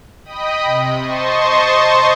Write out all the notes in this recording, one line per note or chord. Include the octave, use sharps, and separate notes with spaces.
D#5 G5 B5 D#6
C3
C5 D#5 A5 C6 C#6